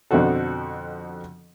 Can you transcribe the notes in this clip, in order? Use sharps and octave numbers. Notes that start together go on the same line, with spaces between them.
F2 B2 D3 C4 F#4 A4